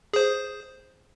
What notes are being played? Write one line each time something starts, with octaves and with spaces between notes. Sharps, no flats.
G#4 C5